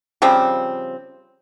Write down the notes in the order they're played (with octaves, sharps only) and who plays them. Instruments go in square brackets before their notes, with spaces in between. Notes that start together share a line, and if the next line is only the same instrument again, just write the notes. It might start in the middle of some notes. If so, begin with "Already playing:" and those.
[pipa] C#3 F3 G3 C4